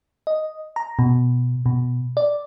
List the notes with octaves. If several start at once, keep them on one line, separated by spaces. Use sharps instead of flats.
D#5
A#5
B2
B2
D5